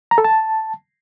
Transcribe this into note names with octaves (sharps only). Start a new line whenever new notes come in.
A#5
A4
A5